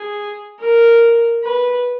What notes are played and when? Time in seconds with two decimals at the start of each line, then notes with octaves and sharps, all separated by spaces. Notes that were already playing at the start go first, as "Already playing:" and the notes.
Already playing: G#4
0.60 A#4
1.43 B4